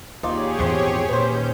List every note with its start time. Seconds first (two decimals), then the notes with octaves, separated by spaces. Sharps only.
0.23 D#2 D#4 F4 G4 G#4 C#5 D5
0.59 G#1 E2 A#2 F3 C4
1.09 D#2 A#2 C#4 B4 C5 G6